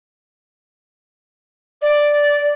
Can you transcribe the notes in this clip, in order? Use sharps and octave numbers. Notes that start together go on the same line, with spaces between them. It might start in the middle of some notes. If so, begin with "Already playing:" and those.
D5